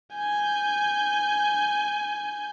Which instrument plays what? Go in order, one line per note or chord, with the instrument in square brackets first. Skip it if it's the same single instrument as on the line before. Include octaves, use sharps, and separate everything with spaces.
[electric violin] G#5 G6